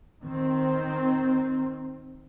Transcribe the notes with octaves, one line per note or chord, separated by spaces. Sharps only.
D#3 C4